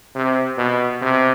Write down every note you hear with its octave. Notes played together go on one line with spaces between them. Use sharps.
C3
B2
C3